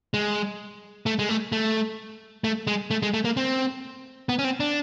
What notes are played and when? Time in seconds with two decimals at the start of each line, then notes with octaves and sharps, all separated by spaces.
0.14 G#3
1.06 A3
1.19 G#3
1.29 A3
1.52 A3
2.44 A3
2.67 G#3
2.91 A3
3.02 G#3
3.14 A3
3.25 A#3
3.37 C4
4.29 B3
4.39 C#4
4.44 C4
4.60 D4